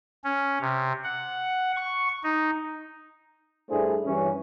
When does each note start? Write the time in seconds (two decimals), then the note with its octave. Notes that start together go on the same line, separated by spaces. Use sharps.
0.24 C#4
0.61 C3
1.04 F#5
1.76 C#6
2.23 D#4
3.70 G2 A3 D4 E4 G#4 C5
4.06 G2 E3 C#4